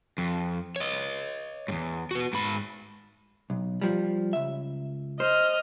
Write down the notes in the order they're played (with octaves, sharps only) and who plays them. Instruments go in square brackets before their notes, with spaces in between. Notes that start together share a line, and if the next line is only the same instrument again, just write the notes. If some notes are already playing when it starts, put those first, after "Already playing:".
[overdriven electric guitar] F2
C#5 D#5
E2 G#2
B3 F#4
G#2 B5
[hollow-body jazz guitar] B1
F3 G3
C#2 E5
[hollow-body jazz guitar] C5 [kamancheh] D#5 F6